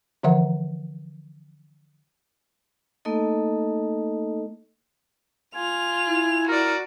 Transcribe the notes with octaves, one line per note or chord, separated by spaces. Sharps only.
D3 E3 F3 E5 F#5
A3 A#3 D#4 A4 D#5
F4 G#5 F7
E4
F#4 A#4 D5